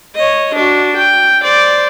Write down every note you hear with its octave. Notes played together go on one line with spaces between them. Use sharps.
C#5 D#5
D4 F#4
G5
C5 D5